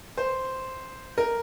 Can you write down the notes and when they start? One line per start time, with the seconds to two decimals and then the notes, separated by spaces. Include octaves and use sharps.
0.18 C5
1.18 A#4